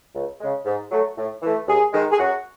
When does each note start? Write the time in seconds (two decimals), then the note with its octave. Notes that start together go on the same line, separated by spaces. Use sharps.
0.15 C#2
0.40 C#3 G#3
0.65 G#2
0.91 F#3 A3
1.17 A2
1.42 E3 A3
1.68 D#2 G#4
1.93 D#3 G#3
2.11 G#4
2.18 F#2 F#4